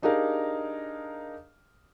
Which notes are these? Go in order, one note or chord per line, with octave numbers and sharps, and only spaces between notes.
D4 D#4 G4 G#4 A#4 F5